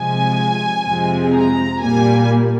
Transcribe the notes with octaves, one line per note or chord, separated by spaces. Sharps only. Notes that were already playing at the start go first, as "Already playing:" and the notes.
Already playing: C3 F3 G#3 G#5
F2 C3 F3 G#3 C4
A#5
A#2 G3 A#3 G#5